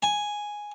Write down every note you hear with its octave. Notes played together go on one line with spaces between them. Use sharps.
G#5